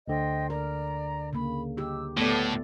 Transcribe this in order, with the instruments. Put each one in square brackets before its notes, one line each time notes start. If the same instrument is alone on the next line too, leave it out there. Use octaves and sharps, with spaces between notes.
[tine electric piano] D2 D3 [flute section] C5 D#5 G5
[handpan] A#4 [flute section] D5 A#5
[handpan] C#3 A#3 [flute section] B5
[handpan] D#4 G4 [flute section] E6
[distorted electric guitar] A2 [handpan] A3 B3 D5 [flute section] A5